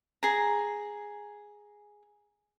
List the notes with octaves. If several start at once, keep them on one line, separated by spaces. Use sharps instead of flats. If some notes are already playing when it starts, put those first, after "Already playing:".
G#4 A#5